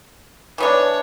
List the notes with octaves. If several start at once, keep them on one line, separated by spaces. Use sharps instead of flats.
E3 B3 D4 C#5